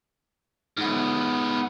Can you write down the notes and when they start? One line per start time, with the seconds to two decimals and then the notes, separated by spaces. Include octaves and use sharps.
0.77 G#2 B3